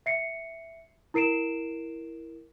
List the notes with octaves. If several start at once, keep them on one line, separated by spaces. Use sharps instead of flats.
E5 C7 C#7
E4 A#4 C7 D7 E7